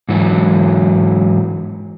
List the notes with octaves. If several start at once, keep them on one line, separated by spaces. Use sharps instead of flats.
G#2 E3 F#3